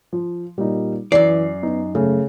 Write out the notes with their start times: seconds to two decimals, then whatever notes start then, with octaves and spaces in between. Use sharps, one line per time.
0.13 F3
0.58 A#2 G3 D#4
1.12 F#2 E3 D5 C7
1.63 B3 D#4
1.95 C#3 A3